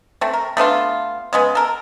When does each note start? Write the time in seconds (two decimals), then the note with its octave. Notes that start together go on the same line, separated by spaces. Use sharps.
0.21 A3 C4
0.34 A#4
0.57 A3 B3 D4 F4
1.33 C#3 G#3 B3
1.55 A4 A#4